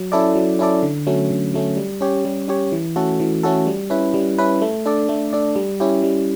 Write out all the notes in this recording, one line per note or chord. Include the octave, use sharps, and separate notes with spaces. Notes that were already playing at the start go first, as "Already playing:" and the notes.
Already playing: F#3
C#4 E4 A4 D5
F#3
C#4 E4 A4 D5
D3
F#3 A3 C#4
D3
F#3 A3 C#4
G3
C#4 G4 C#5
G3
C#4 G4 C#5
E3
A3 C#4 F#4 A4
E3
A3 C#4 F#4 A4
G3
C#4 E4 B4
G3
C#4 E4 B4
A3
D4 A4 D5
A3
D4 A4 D5
G3
C#4 E4 G4
G3